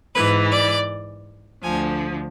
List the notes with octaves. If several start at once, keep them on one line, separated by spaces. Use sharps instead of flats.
G#2 E3 B4
D5
D2 D3 F3 G#5